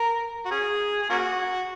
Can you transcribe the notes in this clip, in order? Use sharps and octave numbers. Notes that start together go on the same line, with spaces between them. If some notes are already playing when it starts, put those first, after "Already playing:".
Already playing: A#4
F#4
C#4 G#4
G#4
A#3 C#4 F#4